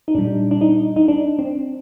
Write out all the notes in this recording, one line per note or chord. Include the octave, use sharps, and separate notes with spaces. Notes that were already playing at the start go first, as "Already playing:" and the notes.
D#4
A#2 G3 D4
D4
D#4
D#4
D4
C4